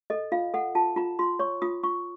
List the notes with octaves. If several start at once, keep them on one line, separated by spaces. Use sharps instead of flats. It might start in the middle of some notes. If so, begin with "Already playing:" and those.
A4 D#5
F4 F5
A4 F#5
F4 A5
F4 A#5
F4 C6
C#5 C#6
F4 D#6
F4 C#6